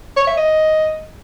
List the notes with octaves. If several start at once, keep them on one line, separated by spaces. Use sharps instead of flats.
C#5
E5
D#5